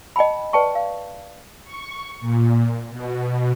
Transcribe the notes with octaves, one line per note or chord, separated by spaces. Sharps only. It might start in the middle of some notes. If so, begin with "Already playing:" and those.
D#5 G5 A5 B5
B4 D5 G5 A5 C#6
F5
C#6
A#2
B2